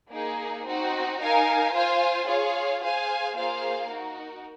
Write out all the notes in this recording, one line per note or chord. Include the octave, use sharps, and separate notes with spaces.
A#3 D#4 G#4
C4 D#4 F#4
D#4 A#4 F5 G#5
F4 C5 F5 G#5
F4 G#4 C#5 F5
G#4 C5 F5 G#5
A#3 F4 G#4 C5 F5
D#4 F#4 A#4